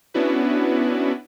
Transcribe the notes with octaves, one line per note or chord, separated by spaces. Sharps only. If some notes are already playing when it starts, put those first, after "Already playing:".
B3 C#4 D4 E4 F#4 B4